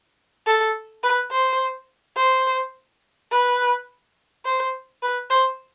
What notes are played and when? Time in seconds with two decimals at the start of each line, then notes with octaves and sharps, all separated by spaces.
0.47 A4
1.04 B4
1.31 C5
2.17 C5
3.31 B4
4.45 C5
5.03 B4
5.30 C5